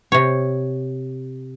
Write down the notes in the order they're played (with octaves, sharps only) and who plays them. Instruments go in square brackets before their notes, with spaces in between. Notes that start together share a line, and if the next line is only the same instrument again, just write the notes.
[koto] C3 C#5